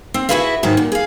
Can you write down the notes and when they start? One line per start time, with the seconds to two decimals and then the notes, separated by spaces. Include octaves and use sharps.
0.14 C4
0.29 E4 F#4 G#4 B4 E5 F5
0.63 G#2 D#3 F#3 F#4
0.77 A#2
0.92 G#4 F5